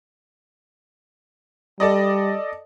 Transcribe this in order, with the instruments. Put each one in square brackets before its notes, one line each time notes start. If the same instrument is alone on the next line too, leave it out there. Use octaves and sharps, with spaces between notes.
[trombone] G3 [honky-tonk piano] A4 D5 D#5